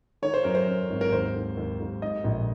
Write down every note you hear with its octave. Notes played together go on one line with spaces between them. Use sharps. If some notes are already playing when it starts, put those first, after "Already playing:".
D#3 C#5
C5
F#2 A#4
C5
F#2
G#1
A#4
D#2 C5
D#3
D#2
D#2
G#2 D#5
A#1